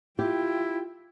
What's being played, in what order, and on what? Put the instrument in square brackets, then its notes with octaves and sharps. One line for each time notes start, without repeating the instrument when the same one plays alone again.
[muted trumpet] E4 [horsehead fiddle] F4 G5 [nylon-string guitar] G4